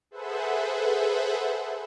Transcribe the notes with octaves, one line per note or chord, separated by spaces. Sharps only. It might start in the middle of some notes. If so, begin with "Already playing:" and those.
G#4 A4 B4 C5 E5 F#5